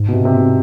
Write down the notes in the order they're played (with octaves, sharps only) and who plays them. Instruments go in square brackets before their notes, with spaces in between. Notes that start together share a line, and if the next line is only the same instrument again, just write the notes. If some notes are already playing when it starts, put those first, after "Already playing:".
Already playing: [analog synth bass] G#2
[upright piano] B2
C3
C3
B2